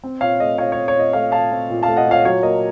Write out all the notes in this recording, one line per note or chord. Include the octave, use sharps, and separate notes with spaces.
C4
A#2 C#5 F5
A3 D#5
A#2 C#5 F5
C4 C#5
C#5
A#2 D#5
A3 C#5 F5
A#2 F5 A5
C4
A#2
F5 A5
A3
D#5 F#5
A#2
C#5 F5
F#3 C#5
A#3 D#5